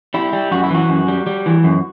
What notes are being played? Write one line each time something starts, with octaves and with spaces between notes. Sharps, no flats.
G3 E4
G3
F#2 F#4
E4
E3 F#4
F#2
G3
G3
E3
F#2